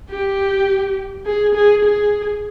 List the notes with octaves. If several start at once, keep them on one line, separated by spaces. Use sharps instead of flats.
G4
G#4
G#4
G#4